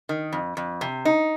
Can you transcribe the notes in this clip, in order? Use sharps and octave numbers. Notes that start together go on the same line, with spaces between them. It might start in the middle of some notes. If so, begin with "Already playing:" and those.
D#3
F2
F2
C3
D#4